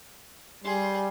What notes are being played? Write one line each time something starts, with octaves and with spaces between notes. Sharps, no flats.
G3 G#4 C6